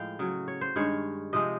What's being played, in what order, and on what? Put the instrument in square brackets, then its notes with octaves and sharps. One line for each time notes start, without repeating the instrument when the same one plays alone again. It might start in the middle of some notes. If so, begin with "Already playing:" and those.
Already playing: [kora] A2 F3 G#3 F5 G5
C#3 F#3
C#5
C5
G2 D#3 G#3 C#5
C3 F3 G#3 D#5